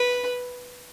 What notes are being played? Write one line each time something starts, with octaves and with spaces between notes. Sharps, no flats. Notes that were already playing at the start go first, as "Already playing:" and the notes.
Already playing: B4